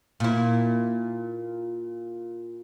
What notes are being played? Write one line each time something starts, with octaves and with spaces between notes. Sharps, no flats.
A#2 E4